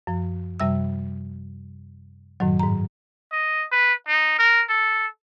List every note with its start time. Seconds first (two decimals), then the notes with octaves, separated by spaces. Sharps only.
0.07 F#2 F3
0.60 F#2 C3 G3 E5 E6
2.40 F#2 A2 D#3 F#3
2.59 G#2 A#5
3.32 D#5
3.72 B4
4.08 D#4
4.39 A#4
4.69 A4